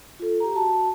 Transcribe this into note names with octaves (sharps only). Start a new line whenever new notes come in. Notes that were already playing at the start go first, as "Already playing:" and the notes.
F4 A4
G4 A#5
F#4 A5